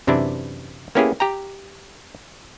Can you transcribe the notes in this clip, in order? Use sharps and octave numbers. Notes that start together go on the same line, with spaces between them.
F#2 C3 E3 D4 E4
A#3 B3 C#4 E4 G4 G#4
G4 G5 A#5